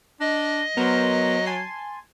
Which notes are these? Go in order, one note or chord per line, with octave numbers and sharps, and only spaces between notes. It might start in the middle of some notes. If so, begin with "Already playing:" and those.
D4 D#5
F#3 B3 A#4 C5
G#5 A5 C6